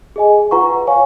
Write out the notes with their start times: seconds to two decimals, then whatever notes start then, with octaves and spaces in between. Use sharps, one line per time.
0.16 G#4 D#5 G#5
0.51 F4 B4 F#5 A#5 C#6
0.87 C#5 F5 G#5 C#6